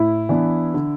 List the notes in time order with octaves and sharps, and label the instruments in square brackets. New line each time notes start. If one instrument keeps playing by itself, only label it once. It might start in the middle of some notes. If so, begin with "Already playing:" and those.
Already playing: [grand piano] A2 [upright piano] E4
[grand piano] E3 B3 D4
D3